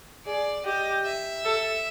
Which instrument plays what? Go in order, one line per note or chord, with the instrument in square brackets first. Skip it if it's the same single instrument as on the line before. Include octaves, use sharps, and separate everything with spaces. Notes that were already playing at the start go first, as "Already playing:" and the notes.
[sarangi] G#4 [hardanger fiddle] D5
[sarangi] G4 [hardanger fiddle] D#5
[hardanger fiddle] E5
[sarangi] A4